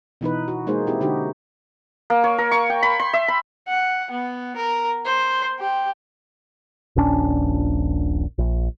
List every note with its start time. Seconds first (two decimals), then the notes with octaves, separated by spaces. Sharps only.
0.21 B2 E3 D#4 B4
0.48 F#4
0.67 G#3 A#3 D#4 G#4 C5
0.87 C4 E4 G4
1.01 D3 D#4 F#4 G4
2.10 A#3
2.24 C#5
2.38 A#4
2.51 C#6
2.70 G5
2.82 B5
3.00 C6
3.13 E5
3.28 B5
3.68 F#5
4.10 B3
4.56 A#4
5.05 C5
5.59 G4
6.96 D#1 A#1 C#4 D4
8.38 A#1